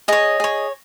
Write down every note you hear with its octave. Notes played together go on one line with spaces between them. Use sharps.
G#4 C#5 D#5
G#4 C#5